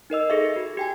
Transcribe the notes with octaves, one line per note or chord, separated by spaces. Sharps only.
D#4 A#4 D#5 E6
G#4 A4 E5
F#4
G4 G5 G#5